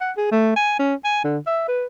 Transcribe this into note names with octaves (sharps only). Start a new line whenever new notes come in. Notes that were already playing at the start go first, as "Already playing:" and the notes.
F#5
G#4
A3
G#5
C#4
G#5
D3
E5
B4